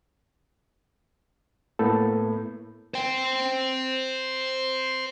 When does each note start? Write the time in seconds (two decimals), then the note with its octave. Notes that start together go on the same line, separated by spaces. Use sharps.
1.79 A2 A#3 B3 A4
2.94 C5 G5